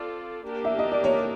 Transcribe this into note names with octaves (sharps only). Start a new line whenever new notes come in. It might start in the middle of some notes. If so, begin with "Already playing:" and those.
Already playing: C4 F4 A4 D5
A#3 D4 G4 A#4
E5
D#5
D5
C#5